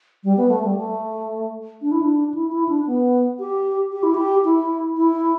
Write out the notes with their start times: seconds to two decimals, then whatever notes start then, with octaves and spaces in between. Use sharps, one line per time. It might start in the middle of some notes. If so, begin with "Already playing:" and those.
0.24 G3
0.37 B3
0.50 A3
0.63 G3
0.77 A3
1.82 D4
1.92 E4
2.02 D4
2.34 E4
2.52 E4
2.69 D4
2.87 B3
3.40 G4
3.92 G4
4.03 E4
4.14 G4
4.45 E4
4.97 E4